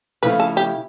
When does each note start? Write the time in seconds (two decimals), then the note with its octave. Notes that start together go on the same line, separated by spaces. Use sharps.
0.23 C#3 F3 A3 C#4 E4 B4
0.40 A4
0.57 G4